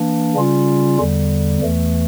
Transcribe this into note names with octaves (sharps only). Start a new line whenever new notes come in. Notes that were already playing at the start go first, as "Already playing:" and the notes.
Already playing: E3 A#3 D4
C#3 G3 C#4 F4
E2 D3 G3
E2 E3 A3